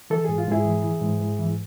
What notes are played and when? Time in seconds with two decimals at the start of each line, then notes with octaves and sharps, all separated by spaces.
0.10 E3 A4
0.24 G#2 G#4
0.38 F4
0.48 G#2 E4 G#4
0.65 E3
0.84 E3
1.01 G#2
1.20 G#2
1.39 E3